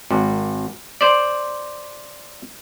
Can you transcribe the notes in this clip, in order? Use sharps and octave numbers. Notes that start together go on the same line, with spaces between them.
G#1
C5 D5